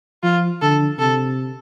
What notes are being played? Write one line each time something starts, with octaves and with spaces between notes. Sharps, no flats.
F3 F4
D3 A4
C3 A4